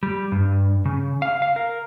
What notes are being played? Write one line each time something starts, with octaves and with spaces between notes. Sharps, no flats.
G3
G2
C#3
F5
F5
A#4